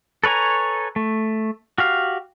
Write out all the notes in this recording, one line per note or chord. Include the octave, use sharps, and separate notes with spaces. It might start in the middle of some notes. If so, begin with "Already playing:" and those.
A4 B4 C#5 G#5 A#5
A3
F#4 G4 F5